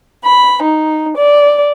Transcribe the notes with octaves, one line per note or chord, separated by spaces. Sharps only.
B5
D#4
D5